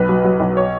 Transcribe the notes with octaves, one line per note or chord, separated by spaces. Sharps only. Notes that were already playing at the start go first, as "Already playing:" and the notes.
Already playing: B1 B4
F#3
F#3
B1
C#5